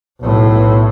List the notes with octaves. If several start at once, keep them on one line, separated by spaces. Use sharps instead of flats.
B1 A2